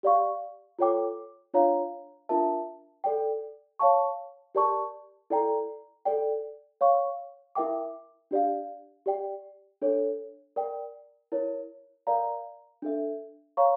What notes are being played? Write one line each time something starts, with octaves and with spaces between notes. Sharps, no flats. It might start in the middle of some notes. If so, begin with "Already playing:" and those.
G4 D5 F5 C#6
F4 A4 C#5 G5 D6
D4 F4 C#5 F5 A#5
D4 F4 A#4 E5 A5
A4 D5 G5
C#5 F5 A5 C#6
G4 A#4 D5 A5 C#6
E4 A4 D5 G5 A#5
A4 D5 G5
C#5 F5 C#6
E4 A#4 E5 G5 D6
D4 G4 D5 F5
G4 D5 G5
D4 A4 C#5
A#4 D5 G5
E4 A#4 C#5
A#4 D5 F5 A#5
D4 A4 E5
C#5 F5 A#5 C#6